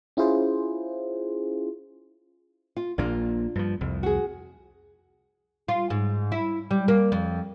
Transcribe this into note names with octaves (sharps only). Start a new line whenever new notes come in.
C#4 E4 F4 G#4 C5
F4
A#1 A#2 A#3 D4 F4
G2 F3
C2 F2
F#4 G#4
F4
G#2
E4
G3
A#3
F2